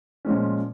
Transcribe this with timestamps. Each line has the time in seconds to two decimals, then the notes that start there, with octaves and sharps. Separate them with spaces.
0.25 A#2 F3 G#3 C#4